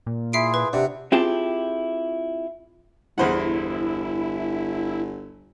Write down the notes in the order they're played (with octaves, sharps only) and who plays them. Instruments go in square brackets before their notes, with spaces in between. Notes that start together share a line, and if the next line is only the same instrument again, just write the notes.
[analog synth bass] A#2
[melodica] E4 F4 G#4 [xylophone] E5 C7 D7
[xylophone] B4
[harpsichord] C3 [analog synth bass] D4 [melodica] F#5
[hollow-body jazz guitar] C4 E4 F4 G4 G#4 A5
[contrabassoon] G1 [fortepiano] E2 C5 F#5 [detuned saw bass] E4